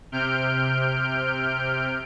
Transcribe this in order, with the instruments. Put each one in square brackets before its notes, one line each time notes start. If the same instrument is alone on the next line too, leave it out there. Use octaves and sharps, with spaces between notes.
[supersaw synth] C3 F6 G6 D7